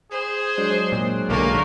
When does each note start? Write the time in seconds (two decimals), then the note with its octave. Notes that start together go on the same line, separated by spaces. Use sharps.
0.12 G#4 C5
0.58 F#3 G#3 D4
0.92 A#2
1.29 B1 A#2 D3 A3 A#3 A#4